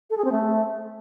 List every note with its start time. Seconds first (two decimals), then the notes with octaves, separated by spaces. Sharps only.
0.10 A4
0.17 G#4
0.25 C4
0.32 A3